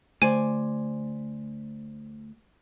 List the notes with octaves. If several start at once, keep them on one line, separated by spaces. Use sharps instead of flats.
D2 A3 C5 D5 G#5 D#7